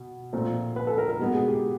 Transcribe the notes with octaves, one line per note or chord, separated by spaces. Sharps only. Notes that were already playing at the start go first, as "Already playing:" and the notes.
Already playing: B2
A#2 F3 A3 C4
B4
A4
A#4
A#4
B2 G#3 B3
G#4
G4